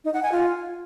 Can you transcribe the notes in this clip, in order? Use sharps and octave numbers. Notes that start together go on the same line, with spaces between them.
D#4
F#5
G#5
F4